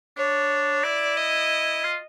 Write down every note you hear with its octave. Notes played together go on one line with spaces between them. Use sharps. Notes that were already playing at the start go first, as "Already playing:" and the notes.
D4 C#5
E4 D5
D#5
F4